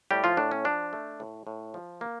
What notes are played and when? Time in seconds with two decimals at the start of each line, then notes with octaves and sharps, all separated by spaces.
0.11 A2 G3 G4
0.24 F3 F4
0.37 A2 D4
0.51 C#4
0.65 F3 D4
0.93 A3
1.20 A2
1.47 A2
1.74 F3
2.01 A#3